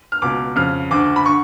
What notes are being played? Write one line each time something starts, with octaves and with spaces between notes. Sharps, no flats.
F6
C#2 B2 D6
F2 C#3 F6
D2 D3 D6
B5
D3 C#6